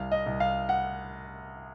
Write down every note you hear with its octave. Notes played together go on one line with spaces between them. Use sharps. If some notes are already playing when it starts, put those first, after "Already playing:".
Already playing: C2 F5
D#5
C2
F5
F#5